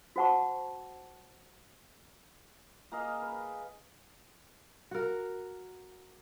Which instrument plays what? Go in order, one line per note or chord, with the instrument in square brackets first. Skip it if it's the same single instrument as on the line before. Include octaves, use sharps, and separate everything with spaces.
[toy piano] F#4 C5 F#5 A5 C#6
[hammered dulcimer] A#3 G#4 D#5 F5
B4
[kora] F#4 A#4